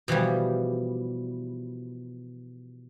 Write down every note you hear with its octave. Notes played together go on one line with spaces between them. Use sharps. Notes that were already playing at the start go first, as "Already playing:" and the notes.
B2 E3 F3 G3